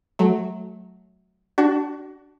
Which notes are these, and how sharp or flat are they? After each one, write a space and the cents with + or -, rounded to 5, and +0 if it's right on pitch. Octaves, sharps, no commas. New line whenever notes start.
F#3 +0 A3 -20
D4 +0 F#4 +30 C#6 +10